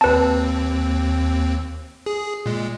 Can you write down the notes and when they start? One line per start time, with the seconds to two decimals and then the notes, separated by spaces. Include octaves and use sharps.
0.01 D#2 C4 B4 A5
2.06 G#4
2.46 A#2 G#3